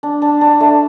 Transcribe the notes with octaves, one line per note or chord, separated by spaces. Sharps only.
D4
D4
D4
A3